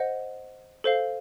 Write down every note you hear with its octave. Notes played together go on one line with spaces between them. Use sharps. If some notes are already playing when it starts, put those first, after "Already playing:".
Already playing: C5 D#5 F#5
A4 C5 F5